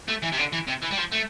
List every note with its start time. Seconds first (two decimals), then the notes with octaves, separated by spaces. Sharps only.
0.09 A3
0.23 E3
0.32 C3
0.38 D3
0.52 E3
0.67 C3
0.82 E3
0.91 G3
0.97 F3
1.12 A3